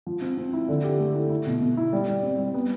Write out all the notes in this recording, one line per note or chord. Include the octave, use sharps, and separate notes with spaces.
F3
C4
C4
E4
D3
G4
A3
E4
E4
B2
B2
E4
G3
G3
C4
G3
B3